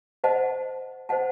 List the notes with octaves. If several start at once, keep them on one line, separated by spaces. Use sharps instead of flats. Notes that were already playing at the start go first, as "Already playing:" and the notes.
C5 D#5 F#5 A5
C5 D#5 F#5 A5